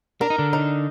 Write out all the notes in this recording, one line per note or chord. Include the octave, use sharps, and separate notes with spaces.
D4 A#4
D#4
D3 D4
D#4